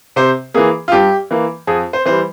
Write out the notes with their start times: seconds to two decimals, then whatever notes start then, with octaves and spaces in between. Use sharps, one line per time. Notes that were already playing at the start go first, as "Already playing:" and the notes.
0.16 C3 C5
0.54 E3 A#3 G#4
0.88 F4
0.92 G2 G4
1.31 E3 A#3
1.67 F2 G#4
1.93 C5
2.06 E3 G3 C5